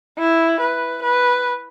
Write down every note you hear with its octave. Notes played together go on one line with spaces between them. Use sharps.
E4
B4
B4